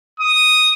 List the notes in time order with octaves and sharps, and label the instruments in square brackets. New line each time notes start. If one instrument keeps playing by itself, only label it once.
[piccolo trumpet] D#6